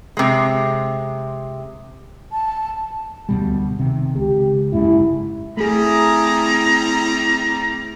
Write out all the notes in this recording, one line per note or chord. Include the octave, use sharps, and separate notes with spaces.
C3 G#3
A5
D2 B2 G3
C3 D#3
C#2 G4
F#1 G#2 C#3 E4
G3 A3 C4 E4 G#4 A#5